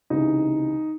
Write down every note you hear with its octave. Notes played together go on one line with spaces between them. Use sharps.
C#2 C3 E3 D#4